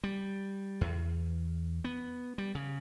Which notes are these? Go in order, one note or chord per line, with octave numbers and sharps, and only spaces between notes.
G3
E2
B3
G3
C#3